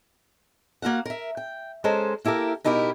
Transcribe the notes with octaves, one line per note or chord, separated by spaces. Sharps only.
A#3 F#4 F5 F#5
A#4 E5
G5
G#3 C#4 A4 C5 A#5
A#3 E4 G4 A4 A#4
B2 D#4 E4 G4 A#4